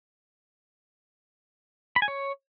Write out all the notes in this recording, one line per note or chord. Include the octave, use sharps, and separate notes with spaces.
B5
G#5
C#5